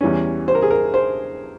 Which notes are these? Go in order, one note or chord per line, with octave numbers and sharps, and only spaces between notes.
E2 E3 G3 C#4
C5
A#4
G#4
A#4
C5